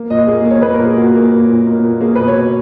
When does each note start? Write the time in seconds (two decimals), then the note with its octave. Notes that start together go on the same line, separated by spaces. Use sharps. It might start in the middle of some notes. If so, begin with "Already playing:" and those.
Already playing: A#3
0.10 A#2 D#5
0.27 A#3 G#4
0.45 A#3
0.50 C#5
0.62 A#3 B4
0.74 A#4
0.79 A#2
0.85 G#4
0.97 A#3 F#4
1.15 A#3
1.32 A#2
1.49 A#2
1.67 A#3
1.84 A#2
2.01 A#3 G#4
2.15 B2 B4
2.28 C#5
2.36 B2